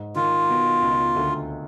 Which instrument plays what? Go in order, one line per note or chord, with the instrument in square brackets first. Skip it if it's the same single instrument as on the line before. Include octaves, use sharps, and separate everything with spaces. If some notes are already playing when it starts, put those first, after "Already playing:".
Already playing: [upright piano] G#2
[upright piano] D#3 [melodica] F4
[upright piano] B2
C#2
D2